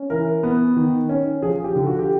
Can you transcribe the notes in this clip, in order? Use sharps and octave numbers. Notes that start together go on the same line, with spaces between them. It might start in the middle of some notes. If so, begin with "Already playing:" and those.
Already playing: C#4
E3 A#4
B3
D#3
C#4
F3 G#4
G4
D3
F#4
G4